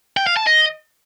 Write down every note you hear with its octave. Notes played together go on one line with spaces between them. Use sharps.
G5
F5
A5
D#5